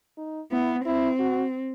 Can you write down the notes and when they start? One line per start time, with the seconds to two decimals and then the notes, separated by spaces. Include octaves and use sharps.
0.17 D#4
0.51 B3 E4
0.85 C4 E4
1.19 F#4